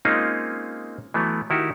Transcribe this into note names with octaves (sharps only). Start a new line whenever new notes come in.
G#3 A#3 C4 C#4 D#4 F4
E3 F#3 A3 B3
D#3 E4 F#4 G4